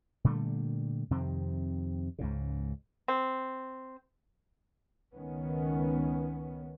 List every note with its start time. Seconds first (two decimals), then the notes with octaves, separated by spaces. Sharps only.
0.24 A#2 D3 G3 A3
1.11 F2 C3 D#3 C4
2.19 C#2 G#2 C#3
3.08 C4
5.13 C#2 D#3 B3 C#4